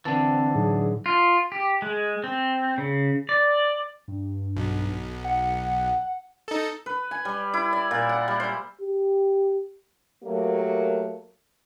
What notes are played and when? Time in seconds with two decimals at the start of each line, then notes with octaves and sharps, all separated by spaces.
0.05 D3 E3 C4 A5 A6
0.55 A2 F#3 D#4 G#4
1.06 F4
1.52 G4
1.82 G#3
2.24 C4
2.78 C#3
3.29 D5
4.08 G2
4.57 B1
5.24 F#5
6.48 D#4 A4
6.86 B4
7.11 G#5
7.25 G3
7.54 E4
7.73 D5
7.91 A#2
8.09 F#5
8.28 G3
8.40 C5
8.81 G4
10.24 F#3 A3 A#3 G4 A#4